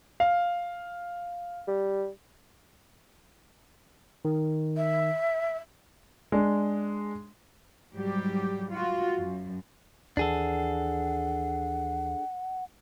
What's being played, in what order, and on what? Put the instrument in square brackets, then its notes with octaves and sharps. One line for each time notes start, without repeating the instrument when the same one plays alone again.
[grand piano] F5
[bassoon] G3
[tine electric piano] D#3
[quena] E5
[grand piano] G#3 D4
[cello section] G#2 F#3 G3 G4
F4 F#4
F#2
[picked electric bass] D#2 E3 [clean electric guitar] D4 G#4 A4 [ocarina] F#5